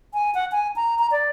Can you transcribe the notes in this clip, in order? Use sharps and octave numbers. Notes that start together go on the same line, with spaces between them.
G#5
F#5
G#5
A#5
A#5
D5